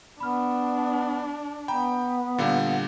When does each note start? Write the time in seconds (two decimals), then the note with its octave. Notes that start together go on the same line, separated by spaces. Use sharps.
0.20 B3 D4 B5 F6
1.68 B3 G5 A#5 B5
2.38 A#2 D3 G3 F5 F#5